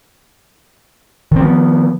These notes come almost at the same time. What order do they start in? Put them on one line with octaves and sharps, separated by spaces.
D#3 C4 F3 B3